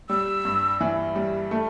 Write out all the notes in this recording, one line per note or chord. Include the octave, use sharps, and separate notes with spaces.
G3 E6
G2
E3
G3
A3